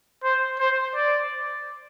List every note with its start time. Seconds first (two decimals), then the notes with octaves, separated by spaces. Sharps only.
0.23 C5
0.59 C5
0.95 D5